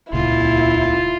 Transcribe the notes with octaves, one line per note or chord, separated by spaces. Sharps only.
D#1 C#2 A#2 E4 F4